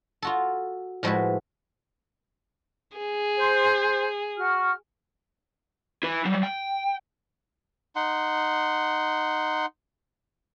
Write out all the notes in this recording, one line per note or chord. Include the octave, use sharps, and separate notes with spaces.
F4 F#4 A4
A2 F3 G#3 E4 F#4 B4
G#4
C5
F#4 F6
E4 B4
F#3 G3
G5
D#4 F#5 C6